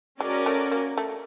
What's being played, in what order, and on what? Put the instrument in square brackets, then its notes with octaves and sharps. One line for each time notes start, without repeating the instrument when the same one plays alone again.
[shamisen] G#3 [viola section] C#4 F#4 A#4 D5
[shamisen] A3
A#3
A3